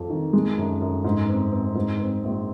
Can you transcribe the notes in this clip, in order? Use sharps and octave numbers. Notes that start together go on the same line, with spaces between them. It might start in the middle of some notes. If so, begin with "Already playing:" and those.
Already playing: F2
D#3
G#3
F#2
F#2
G#2
C4
C4
G#2
C4
A#1